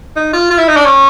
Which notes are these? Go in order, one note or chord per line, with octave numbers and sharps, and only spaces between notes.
D#4
F4
F4
E4
D#4
D4
C#4